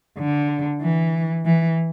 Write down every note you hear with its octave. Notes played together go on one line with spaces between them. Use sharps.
D3
E3
E3